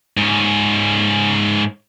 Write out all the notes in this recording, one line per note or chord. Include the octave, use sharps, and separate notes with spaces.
G#2 C#4